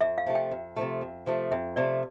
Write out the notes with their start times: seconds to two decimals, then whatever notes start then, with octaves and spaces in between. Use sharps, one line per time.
0.01 F2 E5
0.18 F5
0.26 C3 F3 A3
0.35 G5
0.51 F2
0.76 C3 F3 A3
1.01 F2
1.26 C3 F3 A3
1.51 F2 E5
1.76 C3 F3 A3 D5